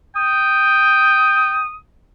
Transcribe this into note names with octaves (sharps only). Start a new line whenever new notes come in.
G5 D#6